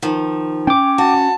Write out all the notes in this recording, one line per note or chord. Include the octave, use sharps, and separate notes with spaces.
D#3 F3
C#4 G5 D6
F#4 A5